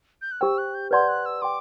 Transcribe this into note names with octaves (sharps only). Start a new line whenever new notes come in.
G6
F#6
G4 C5 G5 E6
F#6
G6
B4 D5 F#5 A5 C6 G6
F#6
E6
G5 C6 D6